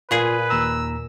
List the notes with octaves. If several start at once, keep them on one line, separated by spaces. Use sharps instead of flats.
A#2 F4 G#4 B4
D#2 A#5 E6